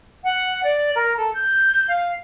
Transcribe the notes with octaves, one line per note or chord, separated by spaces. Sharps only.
F#5
D5
A#4
A4
G6
F5